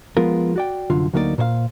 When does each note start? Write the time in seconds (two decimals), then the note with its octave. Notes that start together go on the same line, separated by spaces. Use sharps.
0.17 F3 G#3 B3 F4 A#4
0.56 F#4 D5 G5
0.90 C2 F#2 D3 F4
1.13 D2 F#3 A#3 D#4 F#4 D5
1.38 A#2 C5 C#5 F5